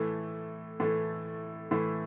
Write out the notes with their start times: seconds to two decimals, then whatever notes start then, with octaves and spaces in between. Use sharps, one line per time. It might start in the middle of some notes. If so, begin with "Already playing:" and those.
Already playing: A2 E3 A3
0.80 A2 E3 A3
1.71 A2 E3 A3